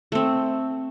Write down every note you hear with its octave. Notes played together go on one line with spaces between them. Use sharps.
A3 C4